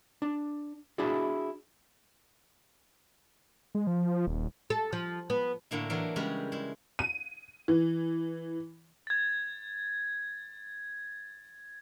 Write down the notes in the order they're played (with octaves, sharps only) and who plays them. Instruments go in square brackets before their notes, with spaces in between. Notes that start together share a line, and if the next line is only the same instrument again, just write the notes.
[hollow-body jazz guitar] D4
D4 E4 F#4 G#4 D5
[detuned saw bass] G#3
F3
D#1
[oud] A4
F3
B3
[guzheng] A2 D3 A#3 E4
E3 F#3 D4 A#4
C#3 G3 G#3 A#4 B4
G#3 E4
[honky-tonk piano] D#7
E3
[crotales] G#6 A6